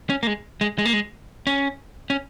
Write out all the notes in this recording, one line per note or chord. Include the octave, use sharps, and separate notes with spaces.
C#4
A#3
G#3
G#3
G#3
A#3
G#3
C#4
C#4